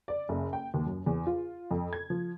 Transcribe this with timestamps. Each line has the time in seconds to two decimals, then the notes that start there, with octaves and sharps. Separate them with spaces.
0.08 D5
0.29 F#1
0.53 G5
0.74 D#2
0.86 F#2
1.06 E2
1.27 F4
1.71 F2
1.93 G#6
2.10 F3